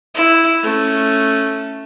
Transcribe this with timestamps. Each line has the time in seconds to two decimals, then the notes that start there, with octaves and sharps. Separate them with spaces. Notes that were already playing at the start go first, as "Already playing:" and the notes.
0.15 E4
0.63 A3 C#4